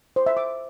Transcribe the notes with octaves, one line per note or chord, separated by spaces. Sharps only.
C5
E5
D6